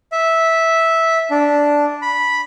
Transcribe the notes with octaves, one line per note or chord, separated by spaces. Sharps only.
E5
D4
B5